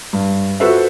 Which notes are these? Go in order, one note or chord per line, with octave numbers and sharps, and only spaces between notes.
G2
F4 F#4 A4 B4 C5 E5